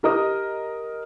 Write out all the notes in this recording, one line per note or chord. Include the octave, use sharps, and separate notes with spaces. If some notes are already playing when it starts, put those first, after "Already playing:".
G4 A#4 D#5 D#6